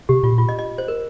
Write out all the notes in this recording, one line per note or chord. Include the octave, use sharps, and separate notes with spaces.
C3 G4
A#2 F4
F4
D#5
D#5
C5
A#4